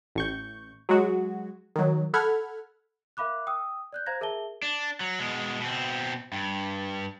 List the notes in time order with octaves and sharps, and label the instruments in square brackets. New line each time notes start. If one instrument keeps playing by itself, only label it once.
[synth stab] A1 C#6 G6
F#3 G#3 F#4
D#3 F#3
A4 F#5 B5 F6 G#6
[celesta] A#4 E5 F5 B5 D6 F#6
G5 D#6 E6
D5 F#6 G6
C5 F5 A#5 G#6 A#6
G#4 A#4 E5 A5 G7
[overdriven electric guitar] D4
F#3
B2 G#3
B2 C4
G2